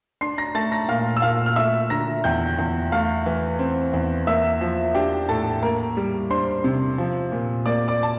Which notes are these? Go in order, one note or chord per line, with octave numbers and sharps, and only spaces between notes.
D4 C6 C7
A#5 A#6
A3 A5 A6
A#5 A#6
A#2 F5 F6
E6
A#2 F5 F6
F6
A3 E5 E6
D3 A#5 A#6
E2 G5 G6
E2
A3 F5 F6
E3
C4
E2
A#3 E5 E6
F3
D4 G4 G5
A2 A4 A5
A#3 A#4 A#5
G3
D4 C5 C6
C3
F3
A#2
A#3 D5 D6
D5 D6
A5